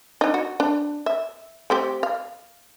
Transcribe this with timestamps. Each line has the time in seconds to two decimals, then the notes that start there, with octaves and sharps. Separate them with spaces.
0.21 D4 D#4
0.34 F#4
0.60 D4
1.06 E5
1.70 A3 C4 G4
2.03 F5